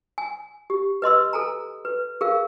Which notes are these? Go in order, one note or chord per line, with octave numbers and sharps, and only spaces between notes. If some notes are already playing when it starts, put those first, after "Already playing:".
G#5
G4
B4 D#5 C6 E6
A4 G#5 A#5
B4
G#4 A#4 F5